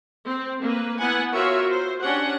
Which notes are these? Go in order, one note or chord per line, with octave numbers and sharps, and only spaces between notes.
C4
A#3 B4
B3 E4 F#5 G#5
F4 F#4 A#4 C#5 E5
C5
C#4 D4 G4 F#5